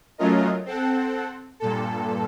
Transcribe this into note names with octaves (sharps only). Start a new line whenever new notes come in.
F#3 A3 C#4 F4 A#4 D#5
C4 A4 F#5
G2 A#2 A4